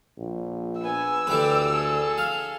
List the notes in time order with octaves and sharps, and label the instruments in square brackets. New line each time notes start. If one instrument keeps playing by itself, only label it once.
[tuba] A#1
[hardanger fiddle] B3 G#5 [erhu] E6
[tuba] D2 [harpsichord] D3 E3 B4 [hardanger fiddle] G4 D5
[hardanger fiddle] G#4 A4
[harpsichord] F5